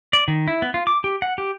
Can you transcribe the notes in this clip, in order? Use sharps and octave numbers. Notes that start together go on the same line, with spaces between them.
D5
D#3
E4
B3
F4
D6
G4
F#5
G4